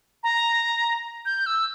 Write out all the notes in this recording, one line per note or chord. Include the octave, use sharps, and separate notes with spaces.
A#5
G6
E6